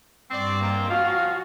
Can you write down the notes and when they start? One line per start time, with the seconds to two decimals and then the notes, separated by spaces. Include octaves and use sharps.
0.30 G2 C4 F#4 D5
0.60 G#2 A#3 F4 G4 A#5
0.90 F3 C#4 F#4 F5